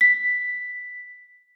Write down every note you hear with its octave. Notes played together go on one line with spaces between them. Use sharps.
B6